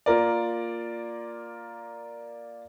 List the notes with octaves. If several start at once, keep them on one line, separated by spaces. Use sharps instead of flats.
A#3 F4 A#4 D5